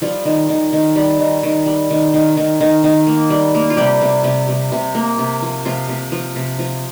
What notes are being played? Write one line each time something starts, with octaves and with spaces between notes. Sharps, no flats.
F3 G3 F4
D#3
D#3
D#3
G3
D#3
D#3
G3
D#3
D#3
D#3
D#3
D#3
A#3
G3
A#3
F4
C3 G3 G4
C3
C3
C3
C3
A#3
C3
F3
C3 F3 F4
C3
F3
C3
F3